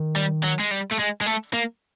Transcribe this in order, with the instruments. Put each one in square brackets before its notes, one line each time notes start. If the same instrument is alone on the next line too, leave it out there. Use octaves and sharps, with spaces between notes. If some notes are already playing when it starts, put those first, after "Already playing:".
Already playing: [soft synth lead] D#3
[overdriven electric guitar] G3
F#3
G#3
G3
A3
G#3
G#3
A3
A#3